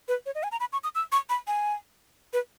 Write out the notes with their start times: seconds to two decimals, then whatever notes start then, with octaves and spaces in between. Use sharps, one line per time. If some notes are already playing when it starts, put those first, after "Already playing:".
0.08 B4
0.26 C#5
0.35 D#5
0.43 G#5
0.52 A#5
0.60 B5
0.72 C#6
0.84 D#6
0.95 E6
1.12 C#6
1.29 B5
1.47 G#5
2.33 B4